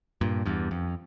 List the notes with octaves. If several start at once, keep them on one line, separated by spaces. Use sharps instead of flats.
G2 A#2
E2 G2
F2